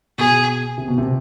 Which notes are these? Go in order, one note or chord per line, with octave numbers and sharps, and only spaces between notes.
B2 G#4
C3
B2
C3